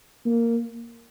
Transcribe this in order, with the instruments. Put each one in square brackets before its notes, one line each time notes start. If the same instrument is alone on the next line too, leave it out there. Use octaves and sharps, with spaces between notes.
[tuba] A#3